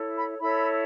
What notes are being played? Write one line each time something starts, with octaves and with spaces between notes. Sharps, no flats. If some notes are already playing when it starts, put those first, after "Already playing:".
Already playing: E4 A4 C#5
B5
E4 A4 C#5 B5